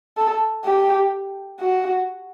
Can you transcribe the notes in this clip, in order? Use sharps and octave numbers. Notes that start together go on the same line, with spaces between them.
A4
G4
F#4